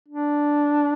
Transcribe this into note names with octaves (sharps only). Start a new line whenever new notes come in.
D4